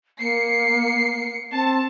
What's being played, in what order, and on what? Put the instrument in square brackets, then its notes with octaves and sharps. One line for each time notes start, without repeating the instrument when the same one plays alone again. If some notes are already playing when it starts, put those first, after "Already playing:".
[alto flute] A#3 [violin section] C7 C#7
[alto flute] C4 [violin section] A5